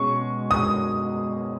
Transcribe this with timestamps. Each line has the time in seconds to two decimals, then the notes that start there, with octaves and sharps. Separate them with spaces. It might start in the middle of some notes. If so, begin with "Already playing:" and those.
Already playing: B2 G#3 C#4 C#6
0.51 D#6